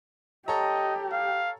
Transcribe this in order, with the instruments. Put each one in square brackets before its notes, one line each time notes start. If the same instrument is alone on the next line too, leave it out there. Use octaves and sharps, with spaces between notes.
[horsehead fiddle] G4 [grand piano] A4 C#5 A#5 [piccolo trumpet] D#5
[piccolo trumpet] F5